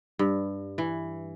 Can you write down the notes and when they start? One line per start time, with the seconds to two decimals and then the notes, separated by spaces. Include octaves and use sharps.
0.19 G2
0.78 E3